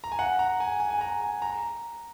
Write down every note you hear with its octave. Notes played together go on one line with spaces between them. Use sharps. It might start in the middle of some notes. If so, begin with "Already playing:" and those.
A#5
G#5
F#5
A#5
G#5
G#5
G#5
A#5
G#5
A#5